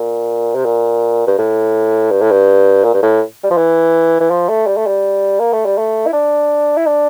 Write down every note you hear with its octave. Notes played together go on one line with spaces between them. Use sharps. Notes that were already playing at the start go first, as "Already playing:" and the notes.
Already playing: A#2
C3
A#2
G2
A2
G2
A2
G2
A#2
G2
A2
G3
F3
E3
E3
F3
A3
G3
A3
G3
A#3
A3
G3
A3
E4
D4
E4
D4